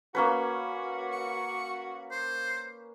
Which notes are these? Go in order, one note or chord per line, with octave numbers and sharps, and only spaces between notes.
A#3 C#4 F#4 B4
C#6
C5